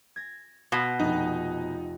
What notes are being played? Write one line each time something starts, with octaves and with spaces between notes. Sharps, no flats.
G#6 A#6
B2 G#6 A#6
F1 F2 D#4